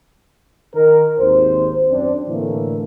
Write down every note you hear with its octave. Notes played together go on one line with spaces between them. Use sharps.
D#3 A#4
G#1 D#2 C5
F#2 C4 D4
A2 D3 E3 A3 A#3